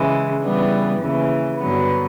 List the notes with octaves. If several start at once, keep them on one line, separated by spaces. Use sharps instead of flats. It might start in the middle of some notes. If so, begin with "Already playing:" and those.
Already playing: C#3 E3 G#3
C#3 E3 G3 B3 D4
D#2 C#3 E3
G2 D3 F#3 B3